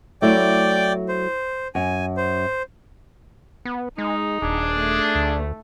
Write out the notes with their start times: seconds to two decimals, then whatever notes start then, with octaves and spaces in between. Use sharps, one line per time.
0.22 F#3 A3 E4 D5 G5 D6
1.08 C5
1.75 F#2 G#5
2.17 C5
3.65 B3
3.98 G#3 D#4
4.42 D#1 D4 G#4
4.76 A3
5.15 D2